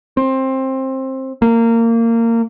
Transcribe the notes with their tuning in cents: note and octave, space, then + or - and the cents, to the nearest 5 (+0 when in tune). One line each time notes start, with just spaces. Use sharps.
C4 +20
A#3 -20